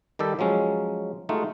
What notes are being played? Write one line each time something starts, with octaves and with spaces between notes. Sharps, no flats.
D#3 G3 G4 A4
F3 F#3 G#3 C#4
G#3 A3 D#4 F4 F#4